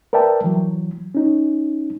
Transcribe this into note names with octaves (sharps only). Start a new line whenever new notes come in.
A#4 B4 D5 E5 G5 A5
E3 F#3
C#4 D#4